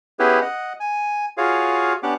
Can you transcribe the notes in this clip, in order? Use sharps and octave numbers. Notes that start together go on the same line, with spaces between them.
B3 C#4 E4 G4 G#4 B4
D#5 F#5
G#5
F4 F#4 G#4 C#5 F5
B3 C#4 D4 G4 F#5 D6